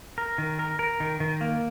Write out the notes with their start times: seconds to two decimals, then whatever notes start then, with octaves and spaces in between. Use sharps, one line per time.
0.18 A#4
0.38 D#3
0.59 A#4
0.79 A#4
1.00 D#3
1.20 D#3
1.41 A#3